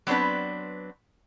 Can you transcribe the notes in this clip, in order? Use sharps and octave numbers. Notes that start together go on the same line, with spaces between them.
F#3 B3 C4 D4 B4